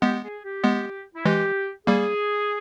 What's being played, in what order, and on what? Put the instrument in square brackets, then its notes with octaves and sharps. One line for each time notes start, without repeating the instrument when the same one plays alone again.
[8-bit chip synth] G#3 B3 [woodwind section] G4
[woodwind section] G#4
G4
[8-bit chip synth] G#3 B3
[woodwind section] E4
[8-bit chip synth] E3 G#3 [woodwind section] G4
[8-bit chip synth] G3 A#3 [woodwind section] G#4